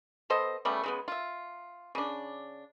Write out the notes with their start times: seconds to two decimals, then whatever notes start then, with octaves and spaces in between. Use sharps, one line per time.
0.30 B3 A4 C5 D#5
0.65 C#3 G3 A3 B3
0.84 C#3 G#3 B3
1.08 F4 E5
1.95 C#3 D4